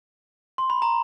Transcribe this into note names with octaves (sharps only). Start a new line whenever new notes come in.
C6
B5
A#5